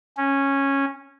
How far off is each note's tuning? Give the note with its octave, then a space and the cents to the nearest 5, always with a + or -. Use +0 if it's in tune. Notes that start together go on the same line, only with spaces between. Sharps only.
C#4 -10